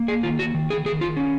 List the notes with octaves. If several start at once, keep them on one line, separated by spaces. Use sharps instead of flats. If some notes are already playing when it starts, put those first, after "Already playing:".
Already playing: A#3
G#4
D#3 F4
F#4
D#3
G#4
D#3 G#4
F4
C#4